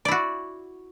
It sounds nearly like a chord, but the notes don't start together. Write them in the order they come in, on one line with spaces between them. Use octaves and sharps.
D5 E4 F#4